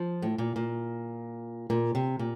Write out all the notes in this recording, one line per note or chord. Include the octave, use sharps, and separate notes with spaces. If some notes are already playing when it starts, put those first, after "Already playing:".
Already playing: F3
A2
A#2
A#2
A#2
C3
A#2